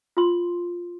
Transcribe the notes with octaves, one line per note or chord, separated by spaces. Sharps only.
F4 C6